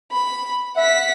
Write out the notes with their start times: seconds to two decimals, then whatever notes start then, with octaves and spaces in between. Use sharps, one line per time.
0.12 B5
0.77 E5 F#5 B6